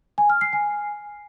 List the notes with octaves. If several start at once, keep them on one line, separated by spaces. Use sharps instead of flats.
G#5
F6
C7
G#5